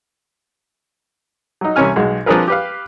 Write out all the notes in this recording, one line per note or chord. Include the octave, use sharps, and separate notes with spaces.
F#3 D#4
C2 C3 E3 C#4 G#5 F6
B1 G#3 F#4
F3 C4 D4 G#4 A#4 B4
G4 B4 F5